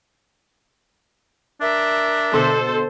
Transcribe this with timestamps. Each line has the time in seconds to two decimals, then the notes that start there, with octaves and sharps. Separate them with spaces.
1.61 D4 A#4 E5
2.33 B2 D3 A4 C5 C6